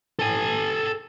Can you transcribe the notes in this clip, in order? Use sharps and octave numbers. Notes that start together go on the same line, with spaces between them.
A4 G#5